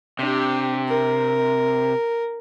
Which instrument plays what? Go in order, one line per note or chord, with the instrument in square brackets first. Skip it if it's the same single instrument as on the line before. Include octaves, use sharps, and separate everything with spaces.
[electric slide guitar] C3 [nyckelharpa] D4 G4
[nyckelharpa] A#4